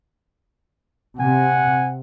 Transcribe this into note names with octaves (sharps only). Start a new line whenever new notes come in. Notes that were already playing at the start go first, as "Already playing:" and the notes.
C3 F#5 G#5